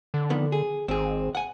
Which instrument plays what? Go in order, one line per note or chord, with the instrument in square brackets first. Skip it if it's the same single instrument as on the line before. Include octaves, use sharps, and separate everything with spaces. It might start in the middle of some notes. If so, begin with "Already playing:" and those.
[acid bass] D3
[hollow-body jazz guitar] F2 D#3 B3
G#4
[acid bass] G#1 [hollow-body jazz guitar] C4 G#4
[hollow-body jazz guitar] F#5 G#5